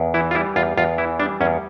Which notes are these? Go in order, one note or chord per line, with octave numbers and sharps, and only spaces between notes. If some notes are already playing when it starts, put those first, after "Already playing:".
Already playing: E2
E3 E4
F4
G3 E4
E2 F4
E2 F4
E3 E4
G3 D4
E2 C#4